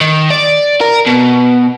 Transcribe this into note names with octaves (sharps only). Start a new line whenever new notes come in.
D#3
D5
A#4
B2